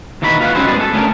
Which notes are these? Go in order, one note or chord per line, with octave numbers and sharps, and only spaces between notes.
D#2 E3 D#4 F#4 B5
F4 B4 F5 F#5
G#3 C#4 E4 F#4 G#4 C5
A2 B3 G#4 D5
A4
A3 C#4 D4 A#4